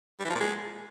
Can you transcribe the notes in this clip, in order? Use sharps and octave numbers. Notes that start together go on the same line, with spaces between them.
G3
E3
F3
A#2
G#3